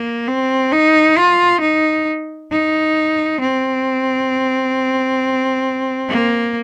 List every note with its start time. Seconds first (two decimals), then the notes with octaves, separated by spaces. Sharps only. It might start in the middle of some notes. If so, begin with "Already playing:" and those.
Already playing: A#3
0.27 C4
0.72 D#4
1.17 F4
1.61 D#4
2.51 D#4
3.41 C4
6.08 A#3